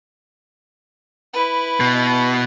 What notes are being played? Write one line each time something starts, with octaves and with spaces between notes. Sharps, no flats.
E4 B4
B2